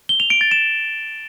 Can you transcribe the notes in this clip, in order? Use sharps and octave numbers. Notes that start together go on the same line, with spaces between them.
G7
F7
D7
A6
E7